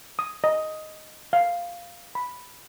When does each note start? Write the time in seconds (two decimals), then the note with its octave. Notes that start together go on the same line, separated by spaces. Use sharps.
0.19 D#6
0.44 D#5
1.33 F5
2.15 B5